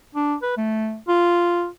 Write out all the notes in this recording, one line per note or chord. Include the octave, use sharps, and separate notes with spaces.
D4
B4
A3
F4